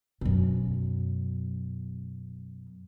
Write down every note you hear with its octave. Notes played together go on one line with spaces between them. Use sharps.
F#2 B2